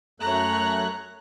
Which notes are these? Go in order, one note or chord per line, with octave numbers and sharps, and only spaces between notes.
F#2 A3 C#5 A#5 F#6